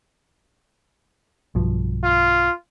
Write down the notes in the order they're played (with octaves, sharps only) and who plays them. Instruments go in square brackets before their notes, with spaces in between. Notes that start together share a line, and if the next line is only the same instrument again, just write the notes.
[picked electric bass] B1 G2 F3
[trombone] F4